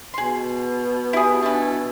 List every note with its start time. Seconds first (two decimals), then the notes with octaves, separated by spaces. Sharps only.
0.14 B2 G#4 C6
1.13 E4 G4 G#4 D#6
1.43 E3 A3 D4
1.57 E6 G#6